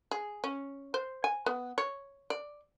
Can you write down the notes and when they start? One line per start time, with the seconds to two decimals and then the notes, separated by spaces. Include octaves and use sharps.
0.11 G#4
0.44 C#4
0.94 C5
1.24 G#5
1.46 B3
1.78 C#5
2.30 D5